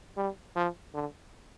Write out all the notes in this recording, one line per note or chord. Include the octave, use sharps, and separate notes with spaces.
G3
F3
D3